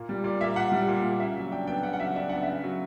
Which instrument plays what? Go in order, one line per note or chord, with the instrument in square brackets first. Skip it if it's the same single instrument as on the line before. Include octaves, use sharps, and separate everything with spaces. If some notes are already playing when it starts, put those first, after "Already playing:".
Already playing: [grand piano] A#2 A#3
G3
A#2 D5
A#3 E5
A#2 F#5
G3
A#2
A#3
C#3 E5
F#3
D4 G5
B3 G5
C#3 F#5
F#5
F#3 E5
D4 E5
B3 F#5
C#3 E5
F#3